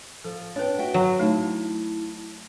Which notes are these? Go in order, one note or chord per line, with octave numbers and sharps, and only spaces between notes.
F3 A4
D4 B4 C#5 G5
F#4 E5 G5
F#3
A3 D#4 E4 A5